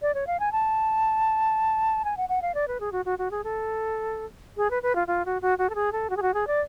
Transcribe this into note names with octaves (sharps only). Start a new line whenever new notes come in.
D5
C#5
F5
G#5
A5
G#5
F#5
F#5
F5
D5
B4
G#4
F#4
F#4
F#4
G#4
A4
G#4
B4
B4
F4
F4
F#4
F#4
F#4
A4
G#4
A4
F#4
G#4
F#4
G#4
D5